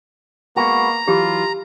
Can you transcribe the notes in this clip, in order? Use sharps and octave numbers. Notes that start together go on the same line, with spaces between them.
G#3 A#3 B3 F#4 A#5
E3 F#3 F4 G4